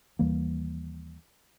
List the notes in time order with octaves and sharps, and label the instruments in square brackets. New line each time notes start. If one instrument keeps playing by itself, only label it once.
[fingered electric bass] D#2 E3 G3 A#3